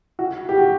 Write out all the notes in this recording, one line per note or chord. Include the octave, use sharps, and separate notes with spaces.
F#4
G4
F#4